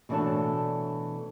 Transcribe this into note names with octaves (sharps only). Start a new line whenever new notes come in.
B2 E3 A3 D4 C#5 A5